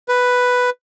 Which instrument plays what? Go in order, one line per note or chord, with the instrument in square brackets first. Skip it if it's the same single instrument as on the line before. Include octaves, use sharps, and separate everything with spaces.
[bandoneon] B4